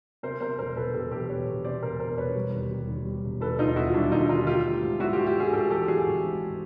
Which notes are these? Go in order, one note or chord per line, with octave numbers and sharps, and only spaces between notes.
C3 A#4 C5
C3 A#4 C5
E1 A#4 C5
E1 A4 B4
E1 G4 A4
E2 G4 A4
E1 B4 C#5
E1
C3 C5 D5
E1 A#4 C5
E1 A#4 C5
E1 B4 C#5
G3
D#2
G3
D#2
G3
E1
D#2 A4 B4
D#2 D#4 F4
E1 E4 F#4
F4
G3 D4 E4
D#2 D#4 F4
D3 D#4 F4
A3 F4 G4
A3
G#2
G#2 E4 F#4
F4 G4
A3
F4 G4
A3 F#4 G#4
G#2 G4 A4
E3 G4 A4
E3 F#4 G#4
G#1
G#2